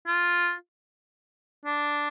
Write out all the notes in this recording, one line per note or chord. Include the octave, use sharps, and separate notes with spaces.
F4
D4